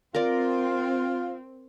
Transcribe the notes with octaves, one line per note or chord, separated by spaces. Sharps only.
C4 F4 A#4 D5